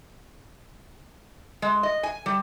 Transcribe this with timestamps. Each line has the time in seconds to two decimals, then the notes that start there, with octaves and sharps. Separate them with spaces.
1.62 G#3
1.83 D#5
2.03 G#5
2.26 G3